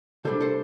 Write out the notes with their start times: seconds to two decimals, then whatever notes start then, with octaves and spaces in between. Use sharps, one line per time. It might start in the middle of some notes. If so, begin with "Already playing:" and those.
0.25 C3 G3 D4 A4 C5
0.40 A4 C5